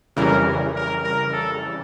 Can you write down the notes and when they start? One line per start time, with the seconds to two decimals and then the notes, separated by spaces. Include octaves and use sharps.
0.17 F2 C#3 E3 G3 A#4
0.75 A#4
1.04 A#4
1.33 A4